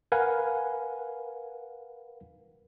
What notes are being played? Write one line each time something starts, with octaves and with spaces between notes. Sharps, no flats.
A#4 B4 F5 F#5 G#5